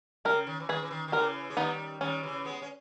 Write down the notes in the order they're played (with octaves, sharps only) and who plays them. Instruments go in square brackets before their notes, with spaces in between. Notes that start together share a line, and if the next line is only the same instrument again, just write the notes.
[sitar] C#3 [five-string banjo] G4 A#4
[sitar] D#3
E3
[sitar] D#3 [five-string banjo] G#4 B4
[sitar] E3
D#3
D#3
[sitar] C#3 E3 [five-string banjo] G4 A#4
[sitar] G#3
[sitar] D#3 G3 [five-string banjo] B3 D#4
[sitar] D#3 G3 [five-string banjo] C#4
[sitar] C#3 E3
G#3 B3
C#4